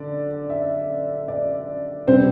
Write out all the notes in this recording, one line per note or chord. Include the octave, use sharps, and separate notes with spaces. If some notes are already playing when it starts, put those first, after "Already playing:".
Already playing: D3 D5
E5
D5
C3 G3 C4 C5